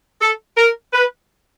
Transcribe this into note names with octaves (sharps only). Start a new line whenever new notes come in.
A4
A#4
B4